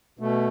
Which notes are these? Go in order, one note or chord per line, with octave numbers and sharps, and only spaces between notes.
B2 A3